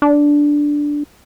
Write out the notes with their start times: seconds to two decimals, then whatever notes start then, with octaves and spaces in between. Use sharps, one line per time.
0.02 D4